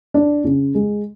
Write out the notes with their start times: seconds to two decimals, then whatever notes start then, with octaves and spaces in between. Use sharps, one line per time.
0.14 D4
0.44 C#3
0.75 G#3